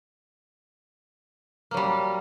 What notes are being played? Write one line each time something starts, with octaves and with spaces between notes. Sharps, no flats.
F#3 G3 A#3